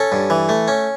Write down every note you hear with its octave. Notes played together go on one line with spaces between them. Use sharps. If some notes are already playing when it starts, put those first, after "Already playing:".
Already playing: C#4 A4
G2
E3
A3
C#4